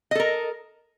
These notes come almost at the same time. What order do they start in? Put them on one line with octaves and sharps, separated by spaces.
D#5 A4 A#4